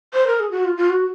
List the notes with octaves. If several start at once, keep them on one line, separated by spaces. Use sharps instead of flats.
C5
A#4
G#4
F#4
F4
F4
F#4